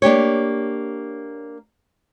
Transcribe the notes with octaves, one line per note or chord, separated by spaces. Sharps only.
A#3 D4 G4 C#5